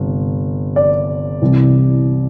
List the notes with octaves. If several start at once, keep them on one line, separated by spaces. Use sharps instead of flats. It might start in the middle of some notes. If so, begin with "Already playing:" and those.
Already playing: G1 C3
D5
C2 C3 E3